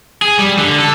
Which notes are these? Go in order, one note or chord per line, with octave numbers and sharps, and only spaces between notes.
G#4
G3
D3
A4